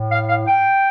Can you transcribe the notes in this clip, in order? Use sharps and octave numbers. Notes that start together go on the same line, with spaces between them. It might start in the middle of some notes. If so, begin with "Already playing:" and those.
Already playing: A2
F5
F5
G5